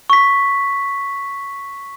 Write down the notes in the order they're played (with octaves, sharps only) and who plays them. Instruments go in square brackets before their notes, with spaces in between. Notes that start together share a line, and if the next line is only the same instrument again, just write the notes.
[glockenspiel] C#6 B6